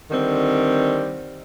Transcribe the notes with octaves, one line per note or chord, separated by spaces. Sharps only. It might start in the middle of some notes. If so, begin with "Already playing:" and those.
D3 D#3 G3 C4